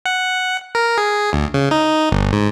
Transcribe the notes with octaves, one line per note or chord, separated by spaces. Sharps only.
F#5
A#4
G#4
D2
C#3
D#4
G1
G#2